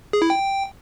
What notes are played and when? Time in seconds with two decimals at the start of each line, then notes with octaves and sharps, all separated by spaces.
0.13 G#4
0.22 E4
0.30 G5